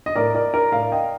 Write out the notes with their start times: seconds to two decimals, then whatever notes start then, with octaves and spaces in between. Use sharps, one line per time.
0.06 D#5
0.16 A2 A#4 D5
0.35 A#4 D5
0.54 A#4 D5
0.72 A2 D5 F5
0.92 D#5 G5